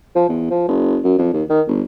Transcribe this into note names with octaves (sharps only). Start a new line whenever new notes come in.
F3
E2
F3
F#1
F#2
F2
D#2
D#3
G1